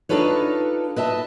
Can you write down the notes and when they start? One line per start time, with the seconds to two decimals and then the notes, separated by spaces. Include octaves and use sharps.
0.09 D4 D#4 F4 A4 B4 C#5
0.96 B4 D#5 E5 A5